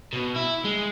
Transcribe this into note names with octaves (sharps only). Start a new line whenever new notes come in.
B2
E4
G#3